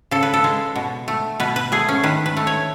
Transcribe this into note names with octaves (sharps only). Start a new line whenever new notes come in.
C#3 A4
B4
A4
G#3
B2
A3
B2 B4
B4
A3 G#4
C#4
D#3 B4
B4
A3
C#5